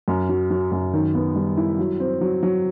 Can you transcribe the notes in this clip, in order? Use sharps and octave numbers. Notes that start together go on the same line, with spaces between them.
F#2
F#3
F#3
F#2
D#3
B3
G3
E4
F#3
C4
F#3
F#3